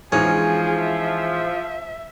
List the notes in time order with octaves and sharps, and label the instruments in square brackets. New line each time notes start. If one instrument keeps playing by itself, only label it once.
[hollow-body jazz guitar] E3 G#3 D#4 [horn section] F3 [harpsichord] C#4 [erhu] G#4
[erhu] E5